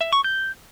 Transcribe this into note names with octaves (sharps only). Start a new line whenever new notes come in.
E5
C#6
G6